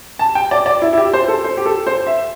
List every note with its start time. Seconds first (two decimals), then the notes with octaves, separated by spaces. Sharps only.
0.19 A5
0.35 G5
0.51 D5
0.66 D5
0.82 E4
0.93 E4
0.98 G4
1.13 C5
1.28 A4
1.44 C5
1.57 G4
1.66 A4
1.87 C5
2.07 E5